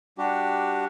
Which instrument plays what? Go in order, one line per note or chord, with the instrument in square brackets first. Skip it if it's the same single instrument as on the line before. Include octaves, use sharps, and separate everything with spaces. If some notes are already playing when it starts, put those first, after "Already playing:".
[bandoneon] G3 D4 F#4 G4